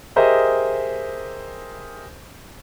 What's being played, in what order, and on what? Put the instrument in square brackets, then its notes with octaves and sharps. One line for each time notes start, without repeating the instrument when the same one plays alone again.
[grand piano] G4 G#4 A#4 C5 D#5 E5